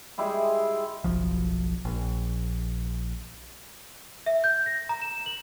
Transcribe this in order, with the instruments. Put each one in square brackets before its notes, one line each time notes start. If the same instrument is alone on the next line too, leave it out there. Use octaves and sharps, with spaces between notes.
[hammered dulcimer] G3 G#3 E4 G#4
[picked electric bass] F#1 B1 F3
A#1
[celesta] E5
G6
A#6
A#5
E7
F#7